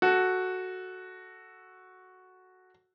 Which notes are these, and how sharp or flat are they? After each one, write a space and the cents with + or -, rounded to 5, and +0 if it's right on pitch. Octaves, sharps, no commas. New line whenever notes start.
F#4 +0 A4 +0